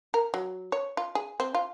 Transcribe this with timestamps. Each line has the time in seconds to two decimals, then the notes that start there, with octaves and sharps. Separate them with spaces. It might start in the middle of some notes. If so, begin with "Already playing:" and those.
0.14 A#4
0.34 F#3
0.72 C#5
0.97 F4
1.15 G#4
1.40 C4
1.55 F4